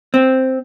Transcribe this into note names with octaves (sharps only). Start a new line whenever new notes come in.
C4